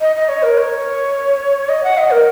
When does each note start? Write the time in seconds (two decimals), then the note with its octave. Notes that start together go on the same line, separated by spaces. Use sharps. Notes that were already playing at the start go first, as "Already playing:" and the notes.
0.01 D#5
0.16 D#5
0.29 C#5
0.43 A#4
0.58 C#5
1.69 D#5
1.84 F#5
1.98 D#5
2.11 A#4